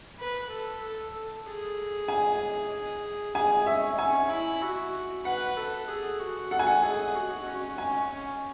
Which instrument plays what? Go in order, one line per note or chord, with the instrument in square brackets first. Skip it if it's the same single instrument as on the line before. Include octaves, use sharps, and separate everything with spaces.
[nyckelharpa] B4
A4
A4
A4
G#4
[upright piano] G#5
[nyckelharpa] G#4 [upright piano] G#5
[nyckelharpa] C#4 [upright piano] E5
[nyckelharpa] C#4 [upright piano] G#5
[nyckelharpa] E4
F#4
[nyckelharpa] B4 [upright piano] F#5
[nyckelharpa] A4
G#4
F#4
[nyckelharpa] A4 [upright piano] F#5
[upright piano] G#5
F#5
[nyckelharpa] G#4
F#4
C#4
[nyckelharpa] C#4 [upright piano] G#5
[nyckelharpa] C#4